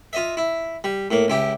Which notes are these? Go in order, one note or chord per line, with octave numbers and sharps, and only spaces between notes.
F4 D#5 E5
E4
G3
A2 A#3
C#2 E4 G4